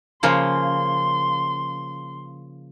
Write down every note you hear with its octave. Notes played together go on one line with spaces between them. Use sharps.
C#3 F3 A#3 C6